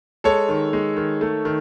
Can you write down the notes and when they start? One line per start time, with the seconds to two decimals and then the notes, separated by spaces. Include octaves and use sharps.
0.24 G#3 A4 C#5
0.49 D#3
0.73 G#3
0.96 D#3
1.21 A3
1.45 D#3